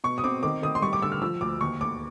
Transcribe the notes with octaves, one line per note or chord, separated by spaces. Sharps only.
B2 C#6
D#6
C4 D6
D#3 D6
D#3 D#6
C6
G3 C#6
D6
D3 E6
F6
F3 E6
D2 D6
D#2 C#6
D#2 D6